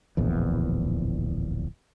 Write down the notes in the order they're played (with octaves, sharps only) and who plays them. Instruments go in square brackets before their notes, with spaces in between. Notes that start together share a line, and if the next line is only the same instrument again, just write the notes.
[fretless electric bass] D1 A#1 E2